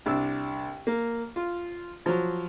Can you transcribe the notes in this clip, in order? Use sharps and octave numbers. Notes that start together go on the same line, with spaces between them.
C2 D4 E6
A#3
F4
F3 F#3